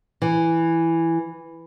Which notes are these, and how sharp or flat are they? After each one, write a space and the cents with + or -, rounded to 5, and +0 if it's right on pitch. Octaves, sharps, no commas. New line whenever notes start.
E3 +5